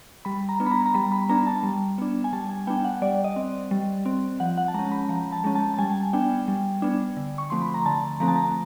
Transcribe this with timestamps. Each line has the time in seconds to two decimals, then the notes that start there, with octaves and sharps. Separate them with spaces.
0.25 G3 B5
0.49 A#5
0.60 B3 D4
0.66 B5
0.71 A#5
0.86 A#5
0.94 G3 B5
1.12 B5
1.29 B3 D4 A#5
1.47 A5
1.63 G3
1.98 B3 D4
2.24 G#5
2.33 G3 A5
2.50 G#5
2.67 B3 D4 G5
2.84 F#5
3.02 G3 D5
3.24 D#5
3.36 C4
3.71 G3
4.06 C4
4.40 F3 F#5
4.57 F#5
4.68 A5
4.74 G#3 C#4 A#5
4.92 B5
5.09 F3 A#5
5.32 A5
5.44 G#3 C#4
5.55 A5
5.74 A5
5.78 G3 G#5
6.13 B3 D4 G5
6.48 G3
6.82 B3 D4
7.17 D3
7.38 C#6
7.50 F3 A3 C4 C6
7.62 B5
7.74 A#5
7.86 D3 A5
8.20 F3 A3 C4 A#5
8.28 A5
8.36 A#5